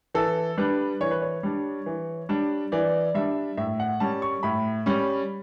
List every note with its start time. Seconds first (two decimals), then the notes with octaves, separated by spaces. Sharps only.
0.14 E3 A4
0.58 G3 D4 B4
1.01 E3 C#5
1.11 B4
1.22 C#5
1.43 G3 D4
1.86 E3
2.29 G3 D4
2.72 E3 D5
3.15 G3 D4 E5
3.57 A2 E5
3.80 F#5
4.00 G3 C#4 A5
4.22 C#6
4.43 A2 B5
4.86 G3 C#4